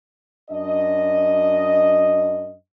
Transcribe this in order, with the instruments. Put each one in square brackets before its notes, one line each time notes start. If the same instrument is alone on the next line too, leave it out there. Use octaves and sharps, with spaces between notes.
[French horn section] F#2 F#3 D4 D#5